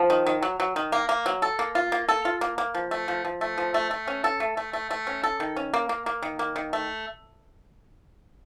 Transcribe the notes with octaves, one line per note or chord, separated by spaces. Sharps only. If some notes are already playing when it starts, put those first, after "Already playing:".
Already playing: F3
D#3
D#3
F#3
F#3
D#3
A#3
A#3
F#3
A4
A#3
F4
A#3
A4
F4
A#3
A#3
F3
A3
F3
F3
A3
F3
A3
A3
C#4
A4
A3
A3
A3
A3
C#4
A4
D#3
C#4
A#3
A#3
A#3
D#3
A#3
D#3
A3